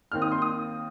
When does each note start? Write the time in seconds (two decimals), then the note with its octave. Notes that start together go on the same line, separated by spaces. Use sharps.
0.12 D#2 D#3 C4 F6
0.22 D#6
0.32 C6
0.42 D#6